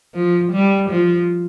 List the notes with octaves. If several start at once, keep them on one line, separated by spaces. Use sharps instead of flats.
F3
G3
F3